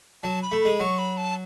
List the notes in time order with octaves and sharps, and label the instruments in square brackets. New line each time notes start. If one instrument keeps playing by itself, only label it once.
[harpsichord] F#3 [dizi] A5
[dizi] B5
[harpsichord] A3
[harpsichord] G#3 [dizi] B5
[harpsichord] F#3 [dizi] C#6
[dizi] B5
A5